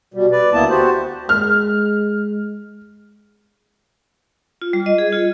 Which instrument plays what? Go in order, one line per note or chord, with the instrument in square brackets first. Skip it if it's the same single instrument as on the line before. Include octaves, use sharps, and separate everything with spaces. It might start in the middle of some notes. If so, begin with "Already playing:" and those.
[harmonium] B2 G3
B4 D5
D2 A#3 B3 E4 A5
F#4 G4 C5
[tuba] G#3 [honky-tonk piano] F6
[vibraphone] F4
G3
D#5
G#4
F4